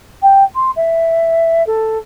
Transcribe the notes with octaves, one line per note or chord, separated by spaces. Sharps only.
G5
C6
E5
A4